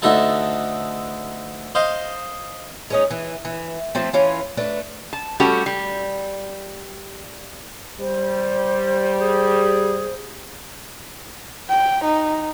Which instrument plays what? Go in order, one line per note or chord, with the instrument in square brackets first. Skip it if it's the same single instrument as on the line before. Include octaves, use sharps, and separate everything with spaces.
[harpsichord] D2 D3 D#4 A4 E5 A5
C5 D#5 F5
[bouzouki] G#3 C#4 D#4
E3
E3
F3 A3 C4
E3 C#4 F4
A3 D4 B4
[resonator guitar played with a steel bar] A5
G3 A3 C#4 F#4 G4 A4
G3
[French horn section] G3 [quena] C5
[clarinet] G#4
[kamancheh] G5
D#4